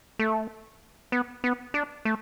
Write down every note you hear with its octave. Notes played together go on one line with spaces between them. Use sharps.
A3
B3
B3
D4
A3